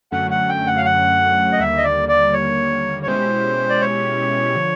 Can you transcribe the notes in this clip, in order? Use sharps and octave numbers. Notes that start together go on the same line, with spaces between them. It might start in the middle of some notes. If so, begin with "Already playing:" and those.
F#2 D3 F#3 A3 C#4 F#5
F#5
G5
F#5
F5
F#5
D#5
D#2 D3 G3 A#3 E5
D#5
D5
D5
C#5
C#5
B2 G#3 C#4 E4 G4 C5
D5
C#5
D3 F3